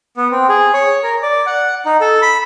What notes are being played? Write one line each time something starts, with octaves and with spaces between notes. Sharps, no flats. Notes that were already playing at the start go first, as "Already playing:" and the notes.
B3
C4
G#4
C#5
A#4
D5
F#5
D#4
A4
B5